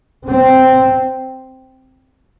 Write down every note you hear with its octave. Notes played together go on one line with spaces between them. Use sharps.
C4